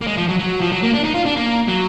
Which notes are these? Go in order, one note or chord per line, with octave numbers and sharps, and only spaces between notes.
A#3
G#3
F3
F#3
F#3
F3
F#3
A#3
D4
D#4
F4
D4
A#3
F#3